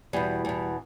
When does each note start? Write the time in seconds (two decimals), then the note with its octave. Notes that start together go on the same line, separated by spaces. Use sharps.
0.13 E2 B2 G3
0.45 E2 B2